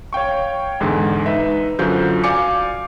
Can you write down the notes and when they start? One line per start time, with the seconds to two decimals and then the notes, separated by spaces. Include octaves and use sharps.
0.13 C#5 F5 G5 C#6
0.80 E2 G#2 D3 G#3
1.26 D#4 B4 E5
1.79 F#2 D3 F4 F#4 C5 G6
2.24 D5 F5 G#5 D6 C#7